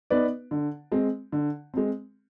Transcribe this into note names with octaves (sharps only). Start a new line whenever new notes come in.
B3 D#4 B4 D5
D3
G#3 C4
D3
G#3 C4